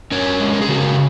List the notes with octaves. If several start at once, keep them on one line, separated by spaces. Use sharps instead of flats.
C#4 A#4 C#5
G#3
A#4
G#4
C#3 F#4 A#4